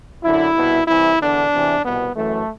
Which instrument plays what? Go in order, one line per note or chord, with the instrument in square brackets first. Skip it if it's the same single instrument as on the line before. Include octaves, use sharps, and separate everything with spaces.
[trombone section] F#2 D3 E4
C2 B2
C2 C3 E3 E4
E2 D3 D4
E2 C3 E3
C2 B2 B3
F#2 E3 A3